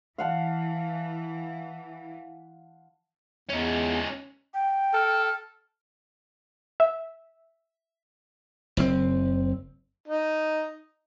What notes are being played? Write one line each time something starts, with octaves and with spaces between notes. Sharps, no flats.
E3 F5 F#5 A5
E2 C#4 D#4
G5
A4 F6
E5
F#1 A#2 C4
D#4